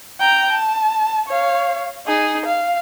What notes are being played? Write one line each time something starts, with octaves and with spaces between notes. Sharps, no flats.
G5 A#5
A5
C#5 F5
D#4 G#4
F5